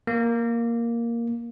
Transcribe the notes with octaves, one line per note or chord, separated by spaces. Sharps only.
A#3